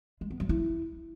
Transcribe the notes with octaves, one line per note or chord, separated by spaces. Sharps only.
G#3
B3
F#3
E4